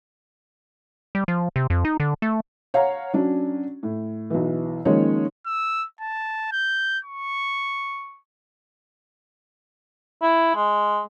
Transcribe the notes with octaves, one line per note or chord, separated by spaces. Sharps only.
G3
F3
C3
F2
D#4
D3
A3
C#5 F5 F#5 A#5
F#3 C#4 D4
A2
B1 E3
D#3 F3 G#3 A#3 C#4 C#5
E6
A5
G6
C#6
E4
G#3